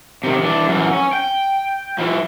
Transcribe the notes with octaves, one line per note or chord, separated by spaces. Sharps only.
C3 D#3
E3 D4
F#2 E3
C#4
G5
F3 E4